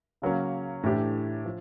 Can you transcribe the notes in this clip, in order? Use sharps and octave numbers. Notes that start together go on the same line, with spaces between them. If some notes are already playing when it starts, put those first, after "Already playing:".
C#3 F#3 A#3 C#4
A2 E3 A3 D4 G4
F3